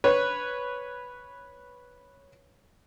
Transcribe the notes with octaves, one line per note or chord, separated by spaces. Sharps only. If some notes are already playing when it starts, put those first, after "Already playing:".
B4 C#5